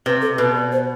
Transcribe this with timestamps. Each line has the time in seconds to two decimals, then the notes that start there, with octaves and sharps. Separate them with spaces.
0.06 C3 B4
0.22 A4
0.38 B2 B4
0.56 D5
0.72 C5